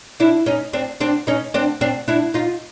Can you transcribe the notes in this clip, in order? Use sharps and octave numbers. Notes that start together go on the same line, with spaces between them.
D4 E4
C#4 D#4
C4 D4
C4 D4
C#4 D#4
C4 D4
C4 D4
D4 E4
D#4 F4